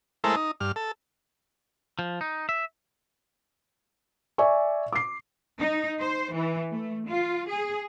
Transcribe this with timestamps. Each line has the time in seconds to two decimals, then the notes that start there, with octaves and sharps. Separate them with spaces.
0.24 G#3 A3 E4 A4 A#4 C5
0.36 D#4
0.60 G2 F6
0.76 A4
1.99 F3
2.21 D#4
2.49 E5
4.38 D5 E5 G#5 C#6
4.92 D6 C7
5.60 D#4
6.00 C5
6.35 E3
6.70 A3
7.07 F4
7.48 G#4